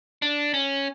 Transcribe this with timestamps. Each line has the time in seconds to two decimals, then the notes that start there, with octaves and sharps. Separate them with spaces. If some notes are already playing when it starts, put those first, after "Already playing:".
0.22 D4
0.54 C#4